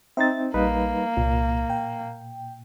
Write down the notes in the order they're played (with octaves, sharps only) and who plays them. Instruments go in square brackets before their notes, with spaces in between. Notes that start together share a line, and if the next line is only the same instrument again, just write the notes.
[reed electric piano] C4 D#4 C5 [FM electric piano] E5 A6
[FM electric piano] A#1 [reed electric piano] G3 D#4 B4 [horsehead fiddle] A#3
[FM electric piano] C2 [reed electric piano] A#2
[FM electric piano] G5